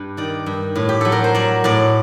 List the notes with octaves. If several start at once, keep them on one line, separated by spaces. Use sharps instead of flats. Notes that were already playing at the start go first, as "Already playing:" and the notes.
Already playing: G2
D#3 D5
G2
A2
G4
F#3 A4
A#4
C5
F#3 D5
A2 D5